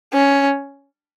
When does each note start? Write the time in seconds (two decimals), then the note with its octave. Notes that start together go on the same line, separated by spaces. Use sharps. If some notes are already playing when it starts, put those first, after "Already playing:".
0.13 C#4